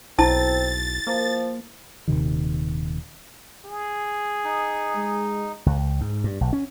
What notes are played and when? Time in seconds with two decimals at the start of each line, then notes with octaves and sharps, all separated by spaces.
0.19 B1 C4 E4 A5 A6
1.07 F3 A#3
2.08 D#1 A#1 C3 D#3
3.65 G#4
4.44 D#4
4.95 G#3
5.66 C#2
6.01 G#2
6.24 G2
6.41 B1
6.53 C#4